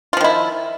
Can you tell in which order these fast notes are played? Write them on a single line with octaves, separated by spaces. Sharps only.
F4 F3 D#3 E4